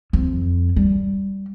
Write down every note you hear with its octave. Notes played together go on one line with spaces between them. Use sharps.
F2
G3